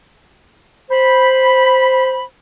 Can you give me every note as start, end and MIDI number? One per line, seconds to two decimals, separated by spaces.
0.91 2.23 72
0.91 2.23 83